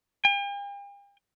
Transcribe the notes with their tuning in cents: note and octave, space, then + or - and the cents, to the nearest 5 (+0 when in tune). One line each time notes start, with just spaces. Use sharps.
G5 +45